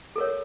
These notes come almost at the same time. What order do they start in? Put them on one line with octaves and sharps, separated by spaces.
A4 A#4 C#5